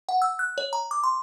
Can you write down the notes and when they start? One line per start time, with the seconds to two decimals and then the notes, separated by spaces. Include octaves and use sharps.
0.09 F#5
0.22 E6
0.39 F#6
0.58 C#5
0.73 A#5
0.91 D6
1.04 C6